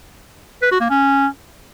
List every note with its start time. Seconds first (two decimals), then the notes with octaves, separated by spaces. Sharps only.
0.62 B4
0.71 F#4
0.81 A#3
0.90 C#4